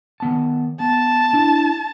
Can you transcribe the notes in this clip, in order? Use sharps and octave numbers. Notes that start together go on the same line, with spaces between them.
D#3 B3 A5
B3 A5
D4 E4